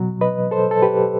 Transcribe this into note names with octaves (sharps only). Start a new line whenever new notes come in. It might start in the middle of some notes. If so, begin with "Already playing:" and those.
Already playing: B2 F#3
B4 D#5
A4 C5
A4
G4 B4